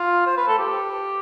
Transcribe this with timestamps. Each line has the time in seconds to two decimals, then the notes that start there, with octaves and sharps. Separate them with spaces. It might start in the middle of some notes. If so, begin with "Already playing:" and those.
Already playing: F4
0.26 C5
0.37 B4
0.48 A4
0.58 G4